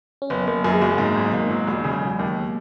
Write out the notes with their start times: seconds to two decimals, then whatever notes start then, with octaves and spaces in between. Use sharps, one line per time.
0.22 C#4
0.30 F#1 B3
0.47 F#1 A#3
0.64 F#2 A#3
0.74 G#3
0.81 F#1 F#3
0.91 A#3
0.98 G#2 G#3
1.16 G#1
1.33 G#2 A#3
1.50 F#3
1.67 E1
1.84 C#3
2.02 E1
2.19 D#2